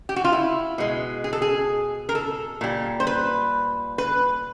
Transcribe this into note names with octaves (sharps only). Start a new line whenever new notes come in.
G4
F#4
F4
E4
B2 G#3
G#4
A4
G#4
A#4
A4
A#2 G3
C5
B4
B4